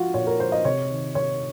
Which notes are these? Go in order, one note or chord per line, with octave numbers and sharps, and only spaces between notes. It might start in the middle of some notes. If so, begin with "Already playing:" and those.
Already playing: F3 F4 F#4
A#2 C#5
A#4
F3 C5
D#5
C3 C#5
D#3
C3 C#5